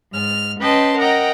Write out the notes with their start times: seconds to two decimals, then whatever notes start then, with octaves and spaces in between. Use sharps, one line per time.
0.11 G#2 F6
0.60 C#4 B4 D#5 G5 A5 C6
0.97 A#4 D#5 F#5 G5 A#5